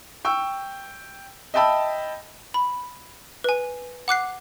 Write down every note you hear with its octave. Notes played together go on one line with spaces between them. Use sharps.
G5 C#6 E6
D#5 E5 G5 A5 B5 E6
B5
B4 G#5
F#5 D6 F#6 C7